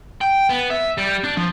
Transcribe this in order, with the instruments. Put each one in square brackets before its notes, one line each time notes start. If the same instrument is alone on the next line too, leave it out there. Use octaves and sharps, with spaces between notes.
[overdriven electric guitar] G5
B3
E5
G3
D4
F3